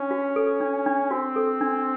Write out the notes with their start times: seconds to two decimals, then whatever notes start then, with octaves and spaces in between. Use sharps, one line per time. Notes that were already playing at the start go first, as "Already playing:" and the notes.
Already playing: C#4 D4
0.11 F#4
0.36 A4
0.61 D4
0.86 D4
1.11 C4 F#4
1.36 A4
1.61 D4